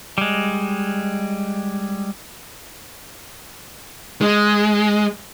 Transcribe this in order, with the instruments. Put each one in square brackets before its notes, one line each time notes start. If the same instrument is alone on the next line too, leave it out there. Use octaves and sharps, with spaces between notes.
[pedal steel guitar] G3 G#3
[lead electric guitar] G#3